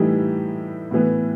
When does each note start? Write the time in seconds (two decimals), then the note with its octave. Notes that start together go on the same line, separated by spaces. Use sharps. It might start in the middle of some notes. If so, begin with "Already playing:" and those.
Already playing: A2 E3 G3 D#4 G4
0.91 A2 E3 B3